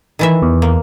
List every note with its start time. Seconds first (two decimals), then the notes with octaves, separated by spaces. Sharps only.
0.19 D#3 E3 E5
0.42 E2
0.62 A#3